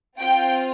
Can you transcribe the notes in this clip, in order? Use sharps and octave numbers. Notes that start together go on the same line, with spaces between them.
C4 F4 G5